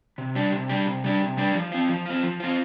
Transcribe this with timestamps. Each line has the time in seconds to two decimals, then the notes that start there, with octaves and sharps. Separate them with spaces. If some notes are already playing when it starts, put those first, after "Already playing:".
0.18 C3
0.35 G3 D4 G4
0.52 C3
0.69 G3 D4 G4
0.86 C3
1.04 G3 D4 G4
1.21 C3
1.37 G3 D4 G4
1.54 F3
1.72 C4 F4
1.89 F3
2.06 C4 F4
2.23 F3
2.40 C4 F4